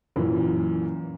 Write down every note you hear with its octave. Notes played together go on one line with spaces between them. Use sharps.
F#2 A#2 E3